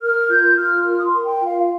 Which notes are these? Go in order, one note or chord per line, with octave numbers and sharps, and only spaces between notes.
A#4 F6
F4 G6
F4 F6
A#4 F6
D#6
C6
A#4
G5
F4
F5
F5